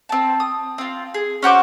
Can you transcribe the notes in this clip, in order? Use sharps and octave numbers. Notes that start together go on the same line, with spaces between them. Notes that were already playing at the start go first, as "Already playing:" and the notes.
C4 A5
D#6
C4 F4
G#4
C#4 F#4 C5 D6